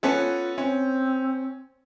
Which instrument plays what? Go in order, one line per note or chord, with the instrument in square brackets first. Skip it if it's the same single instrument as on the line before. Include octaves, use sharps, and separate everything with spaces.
[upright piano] B3 C#4 A4 [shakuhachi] F4
[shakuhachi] C4 [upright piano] C#4